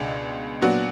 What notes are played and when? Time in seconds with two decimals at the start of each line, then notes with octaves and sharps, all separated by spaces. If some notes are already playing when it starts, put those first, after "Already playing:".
Already playing: C#2 B2 G#3 B3 D4
0.61 A#2 F#3 B3 D4 F#4